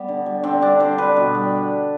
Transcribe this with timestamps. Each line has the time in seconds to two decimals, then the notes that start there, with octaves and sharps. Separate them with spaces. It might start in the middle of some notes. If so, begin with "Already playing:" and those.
Already playing: G3 B3
0.08 D3
0.26 G3
0.43 D3 C4
0.61 G3 D4
0.80 D3 C5
0.98 G3 B4
1.16 B2
1.35 G3